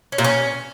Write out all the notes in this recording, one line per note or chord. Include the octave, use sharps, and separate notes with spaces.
C#4
A#2
C#4